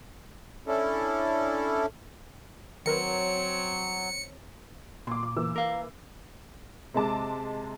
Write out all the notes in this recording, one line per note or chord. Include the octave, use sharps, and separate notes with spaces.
C#4 D4 E4 A4
D#3 F#3 C4 A#4 B4 C#5 C#7
A#2 C6 D6
D6
E3 A#3 E6
A#4 F5
C3 G#3 A5 D6